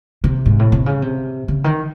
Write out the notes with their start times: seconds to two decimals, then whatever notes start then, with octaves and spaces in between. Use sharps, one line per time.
0.24 C3
0.46 G#2
0.59 A2
0.72 C3
0.86 C#3
1.02 C3
1.48 C#3
1.64 D#3